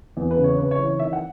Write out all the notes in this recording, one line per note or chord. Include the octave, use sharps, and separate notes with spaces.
E2
B4
C#3
C#5
C#3 B4
C#5
E3
C#5
D#3 E5
F#5